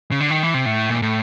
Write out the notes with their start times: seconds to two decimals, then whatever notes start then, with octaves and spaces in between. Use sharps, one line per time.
0.11 C#3
0.20 D3
0.30 D#3
0.43 E3
0.54 C3
0.66 A2
0.90 A#2
1.02 A2